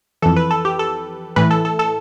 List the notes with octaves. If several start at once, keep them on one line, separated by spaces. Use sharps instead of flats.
F2 E3 A4
B4
A4
G4
A4
A2 E3 B4
A4
A4
A4